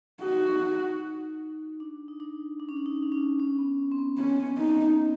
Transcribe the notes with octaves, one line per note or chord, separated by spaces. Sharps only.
D#4 F#4
D4
D#4
D4
D4
C#4
D4
D#4
D4
C#4
C#4
B3
C4
B3
B3 C#4
D#4